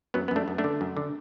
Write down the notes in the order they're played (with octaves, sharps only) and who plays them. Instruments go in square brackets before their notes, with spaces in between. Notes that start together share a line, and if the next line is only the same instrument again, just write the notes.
[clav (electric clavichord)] F#2 F#3 B3
B3
F#2 A3 D4
F#2
A3 D4
D3
F#2
D3